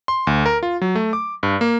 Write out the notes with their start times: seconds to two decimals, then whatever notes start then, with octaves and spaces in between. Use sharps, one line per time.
0.08 C6
0.27 D2
0.46 A#4
0.63 F4
0.81 F#3
0.95 A3
1.13 D6
1.43 G2
1.61 A#3